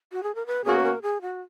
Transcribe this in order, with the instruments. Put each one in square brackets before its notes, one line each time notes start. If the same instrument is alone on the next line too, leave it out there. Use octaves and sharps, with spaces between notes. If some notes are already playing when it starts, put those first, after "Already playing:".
[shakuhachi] F#4
G#4
A#4
B4
[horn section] B2 A#3 C#4 F#4 [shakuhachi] G#4
[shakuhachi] B4
A#4
G#4
F#4